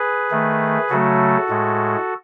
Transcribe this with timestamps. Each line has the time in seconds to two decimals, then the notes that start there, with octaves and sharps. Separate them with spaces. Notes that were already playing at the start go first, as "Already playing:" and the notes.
Already playing: G#4 B4
0.31 D#3 A3
0.90 C#3 F#3 A3 F#4 A4
1.49 A2 G#3